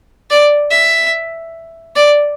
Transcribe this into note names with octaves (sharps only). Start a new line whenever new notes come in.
D5
E5
D5